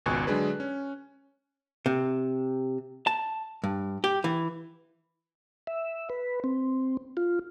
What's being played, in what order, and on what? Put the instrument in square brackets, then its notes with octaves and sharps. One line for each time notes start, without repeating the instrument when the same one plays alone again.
[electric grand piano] G#1 C#2 B2 G#5 C#6 F#6
D3 F#3 G#3 D4 G#4 B4
C#4
[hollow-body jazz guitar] C3
A5
G2
G4
E3
[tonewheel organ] E5
B4
C4
F4